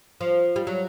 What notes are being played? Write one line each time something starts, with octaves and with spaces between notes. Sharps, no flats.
F3
G3
F#3